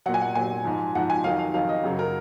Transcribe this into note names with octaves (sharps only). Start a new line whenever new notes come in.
A#2 F#3 F#5
G#5
F#5
A#2 F#3 G#5
G#2 F3
G#2 F3 F#5
G#5
F2 D#3 F#3 F5
F5
F2 D#3 F#3 F5
D#5
F#2 C#3 F#3
A#4